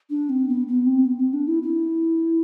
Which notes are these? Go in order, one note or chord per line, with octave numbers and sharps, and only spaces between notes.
D4
C4
B3
B3
C4
B3
C4
D4
E4
E4